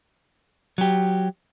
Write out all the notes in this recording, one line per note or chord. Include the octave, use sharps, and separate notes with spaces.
F#3 G4